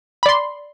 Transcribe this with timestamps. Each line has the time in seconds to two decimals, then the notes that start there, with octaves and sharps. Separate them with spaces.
0.23 B5
0.26 D5
0.29 C6